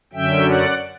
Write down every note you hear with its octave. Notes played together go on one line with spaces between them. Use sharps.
F#2 D3 F#3 C#4 E5 G5
D5 F#5